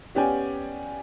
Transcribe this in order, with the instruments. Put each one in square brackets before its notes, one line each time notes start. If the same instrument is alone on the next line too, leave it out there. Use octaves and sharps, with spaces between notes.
[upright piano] B3 C#4 G4 D5 G5 G#5